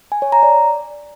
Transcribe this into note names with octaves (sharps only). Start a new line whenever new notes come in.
G#5
C#5
A#5
D5